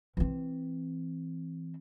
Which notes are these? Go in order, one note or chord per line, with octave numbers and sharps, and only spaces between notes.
E3 C4